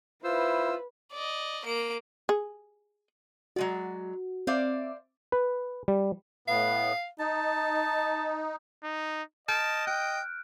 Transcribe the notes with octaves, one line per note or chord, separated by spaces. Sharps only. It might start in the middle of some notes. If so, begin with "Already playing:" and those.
E4 F4 B4 C5 E6
D5 D#5
A#3 D7
G#4
F#3 G#3 F#4 D5
C4 C5 D5 E5 F5 D6
B4
G3
A2 B3 F5
D#4 A5
D#4
D#5 A5 F6 G6 D7
G5 F#6